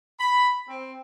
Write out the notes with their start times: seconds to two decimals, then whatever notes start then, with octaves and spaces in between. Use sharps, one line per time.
0.19 B5
0.67 C4